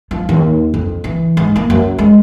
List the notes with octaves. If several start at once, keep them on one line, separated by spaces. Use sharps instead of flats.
F3
D#2
F2
E3
G#2
A#3
F#2
G#3